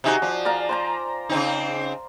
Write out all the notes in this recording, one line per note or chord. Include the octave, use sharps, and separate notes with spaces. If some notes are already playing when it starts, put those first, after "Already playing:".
C3 D#4 F#4 G#4 G5
F3 D5
D5 F5 A#5
C5 G5 A#5
C#3 C4 D#4